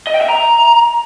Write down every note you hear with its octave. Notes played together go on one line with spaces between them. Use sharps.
D#5
G5
E5
A#5